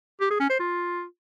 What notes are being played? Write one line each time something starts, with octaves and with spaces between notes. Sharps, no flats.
G4
G#4
C#4
C5
F4